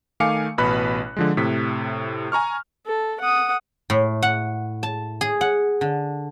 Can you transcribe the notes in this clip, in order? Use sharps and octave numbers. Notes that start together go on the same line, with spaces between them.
D#3 A3 F5 G#5 D6 C#7
A1 B2 B4 B5 F#6
D3 F3 G#3
A2 C3 B6
G#5 A#5 C#6 F6
A4
F#5 D#6
A2
F#5
A5
G#4
F#5
D3